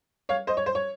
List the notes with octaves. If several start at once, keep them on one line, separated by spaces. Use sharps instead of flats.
C#5 F5
C5 D#5
C#5
C5
C#5